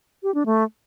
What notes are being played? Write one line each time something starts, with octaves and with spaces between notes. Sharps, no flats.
G4
D4
A3